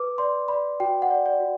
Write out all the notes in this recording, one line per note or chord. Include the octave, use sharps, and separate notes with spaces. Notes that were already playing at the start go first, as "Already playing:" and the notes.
Already playing: B4 D6
D5 C6
D5 B5
F#4 G5
F#5
D5
D5
F#4